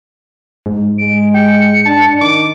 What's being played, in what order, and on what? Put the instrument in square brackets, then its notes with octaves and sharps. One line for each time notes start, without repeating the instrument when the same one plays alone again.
[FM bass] G#2
[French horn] G#3 [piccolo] D7
[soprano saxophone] G5 [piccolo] C#7
[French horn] D4 [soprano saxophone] A5
[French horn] D#3 [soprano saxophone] D6